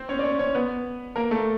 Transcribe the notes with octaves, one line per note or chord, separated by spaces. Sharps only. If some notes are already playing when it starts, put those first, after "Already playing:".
Already playing: C4 C5
C#4 C#5
D5
C#4 C#5
C#4 C#5
B3 B4
A#3 A#4
A3 A4